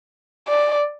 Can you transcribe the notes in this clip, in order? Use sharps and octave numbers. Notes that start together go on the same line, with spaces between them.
D5